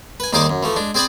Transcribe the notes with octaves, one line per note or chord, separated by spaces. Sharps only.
B4 G#5
D#2 G3 D#4 G#4 C5 D6
F#2
E3 F3 A3
G#3 D4
C4 G#4 C5 D5 G#5 B5